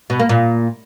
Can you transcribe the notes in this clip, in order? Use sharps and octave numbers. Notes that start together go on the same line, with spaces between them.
B2
A#3
A#2